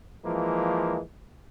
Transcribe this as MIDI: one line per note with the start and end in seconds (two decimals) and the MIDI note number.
0.23 0.99 52
0.23 0.99 53
0.23 0.99 56
0.23 0.99 58